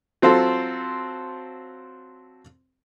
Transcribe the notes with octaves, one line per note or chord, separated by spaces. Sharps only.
F#3 C4 F4 A4